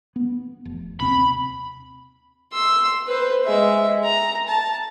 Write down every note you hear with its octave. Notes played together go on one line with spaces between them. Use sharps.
B3
F1
D#2 C3 C4 B5
C6 E6
B4 C5
G#3 E5
A#5
A5